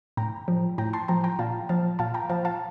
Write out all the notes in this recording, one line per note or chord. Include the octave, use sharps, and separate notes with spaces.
A2 G5 A#5
F3
A2 G5 A#5
A5 C6
F3 G5 A#5
G5 A#5
A#2 F5 A5
F3 F5 A5
A#2 F5 A5
G5 A#5
F3 F5 A5
F5 A5